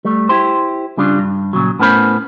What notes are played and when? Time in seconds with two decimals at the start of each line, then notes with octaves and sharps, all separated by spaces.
0.05 G3 A3
0.29 E4 G4 C5
0.97 C#3 G3 D4 F4
1.19 G2
1.53 A#2 C#3 F#3
1.79 A2 B3 C#4 A#4 C5 B5